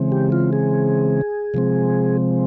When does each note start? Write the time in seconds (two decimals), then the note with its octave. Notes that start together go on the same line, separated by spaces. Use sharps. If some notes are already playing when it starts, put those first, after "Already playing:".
Already playing: C#3 E3 G#3 C4
0.12 G4
0.32 F4
0.53 G#4
1.54 C3 F3 G#3 C4